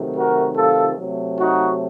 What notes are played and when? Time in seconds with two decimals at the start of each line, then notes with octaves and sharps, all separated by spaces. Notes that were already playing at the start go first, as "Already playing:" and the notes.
Already playing: C3 D#3 F#3 A3
0.15 F#4 A#4
0.56 F4 A4
0.96 C3 F#3 A3
1.38 D#4 F#4